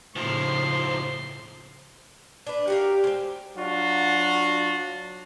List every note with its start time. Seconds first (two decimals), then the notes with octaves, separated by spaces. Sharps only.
0.16 D#2 A2 C#3 F3 C5 C6
2.46 D4 B4
2.68 F#4 G4 A#4 F5
3.04 G#3 C4
3.57 F#3 D4 F4 F#4